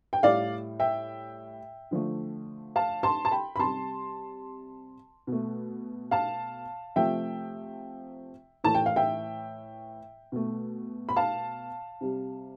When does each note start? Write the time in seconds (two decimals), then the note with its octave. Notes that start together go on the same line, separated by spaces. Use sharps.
0.13 G5
0.23 A2 G3 D5 F5
0.80 E5 G5
1.91 D3 F3 A3
2.76 F5 A5
3.03 A5 C6
3.25 A5
3.32 G5 B5
3.56 B5
3.59 C3 G3 A5 C6
5.27 B2 A3
6.11 F5 A5
6.96 C3 F3 A3 E5 G5
8.64 A2 E3 A3 A5
8.75 G5
8.86 F5
8.96 E5 G5
10.32 B2 A3
11.09 B5
11.16 F5 A5
12.01 C3 G3